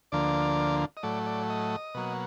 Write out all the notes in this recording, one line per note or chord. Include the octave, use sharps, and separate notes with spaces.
D2 D3 F3 A#3 D5
D#5
A2 F#3 A3 D5
D5
D#5
B2 F#3 A#3